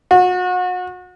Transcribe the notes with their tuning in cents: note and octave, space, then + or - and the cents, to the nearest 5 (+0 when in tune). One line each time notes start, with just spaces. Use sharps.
F#4 -35